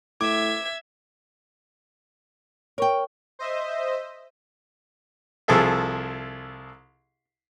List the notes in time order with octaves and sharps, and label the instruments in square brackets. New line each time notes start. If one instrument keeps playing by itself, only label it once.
[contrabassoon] A2 [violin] E5 G#6 [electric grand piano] D6
[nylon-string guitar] A#4 G5 [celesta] C#5 C#6
[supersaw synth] C5 D#5 E5
[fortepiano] C2 F3 G#4 A4 E5